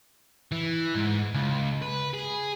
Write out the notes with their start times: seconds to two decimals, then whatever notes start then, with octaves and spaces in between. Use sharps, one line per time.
0.52 E3
0.96 G#2
1.34 C#2
1.82 B4
2.14 G#4